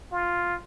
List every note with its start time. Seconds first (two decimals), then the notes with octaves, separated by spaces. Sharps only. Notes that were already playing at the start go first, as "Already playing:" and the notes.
0.12 F4